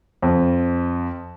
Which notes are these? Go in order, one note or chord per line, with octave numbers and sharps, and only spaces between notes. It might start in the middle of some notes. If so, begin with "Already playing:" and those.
F2